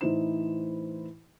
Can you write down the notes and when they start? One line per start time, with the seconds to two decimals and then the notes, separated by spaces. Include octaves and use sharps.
0.01 A2 E3 D#4 E4 C5 E7